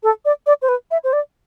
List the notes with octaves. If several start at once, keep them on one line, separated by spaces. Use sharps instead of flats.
A4
D5
D5
C5
B4
E5
C5
D5